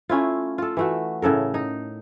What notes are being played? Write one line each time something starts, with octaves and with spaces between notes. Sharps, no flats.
A3 C#4 E4 F4
F4 A4
E3 A3 F#4
A2 C#3 A4 A#4
D#4